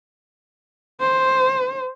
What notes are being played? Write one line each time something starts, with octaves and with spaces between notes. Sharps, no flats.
C5